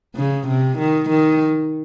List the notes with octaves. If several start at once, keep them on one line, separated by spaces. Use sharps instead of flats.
C#3
C3
D#3
D#3